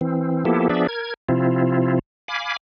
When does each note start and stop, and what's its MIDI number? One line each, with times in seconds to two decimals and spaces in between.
0.01 0.45 52
0.01 0.45 60
0.45 0.68 53
0.45 0.68 58
0.45 0.68 59
0.45 0.68 64
0.45 0.68 67
0.45 0.68 69
0.69 0.87 53
0.69 0.87 59
0.69 0.87 62
0.69 0.87 68
0.69 0.87 74
0.69 0.87 76
0.88 1.14 70
0.88 1.14 92
1.29 1.99 48
1.29 1.99 53
1.29 1.99 60
1.29 1.99 64
1.29 1.99 65
2.28 2.57 77
2.28 2.57 80
2.28 2.57 83
2.28 2.57 86